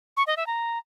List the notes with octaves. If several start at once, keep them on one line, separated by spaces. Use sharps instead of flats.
C#6
D#5
E5
A#5